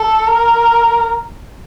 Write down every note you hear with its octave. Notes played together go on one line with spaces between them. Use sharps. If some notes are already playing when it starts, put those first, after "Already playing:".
Already playing: A4
A#4